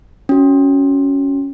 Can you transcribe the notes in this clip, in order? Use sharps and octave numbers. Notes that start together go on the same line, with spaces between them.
C#4 F#4